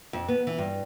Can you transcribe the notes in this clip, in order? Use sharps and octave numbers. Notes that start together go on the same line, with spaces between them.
F2
B3
E3
G2